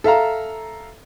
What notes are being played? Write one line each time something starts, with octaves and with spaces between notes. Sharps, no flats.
A4 E5 F5 A#5